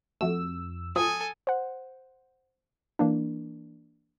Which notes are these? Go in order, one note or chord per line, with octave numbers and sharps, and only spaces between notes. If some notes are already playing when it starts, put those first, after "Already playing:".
F2 A3 F#4 E6
F3 A4 G#5 D#6
C5 F#5
E3 A#3 D4